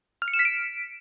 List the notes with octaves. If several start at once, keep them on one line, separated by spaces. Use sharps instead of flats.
F6
C#7
E7
B6
D7